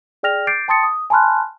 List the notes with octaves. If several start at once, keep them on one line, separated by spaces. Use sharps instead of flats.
G#4 D5 G5 F6 A#6 F7
D6 G6 A6 C7 D7
G5 A5 C6 D#6 A6 C#7
D#6
G#5 A5 B5 C6 F6 F#6